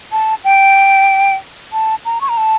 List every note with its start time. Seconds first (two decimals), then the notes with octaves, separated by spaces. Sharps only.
0.12 A5
0.44 G5
1.73 A5
2.05 A#5
2.21 C#6
2.29 A#5
2.37 A5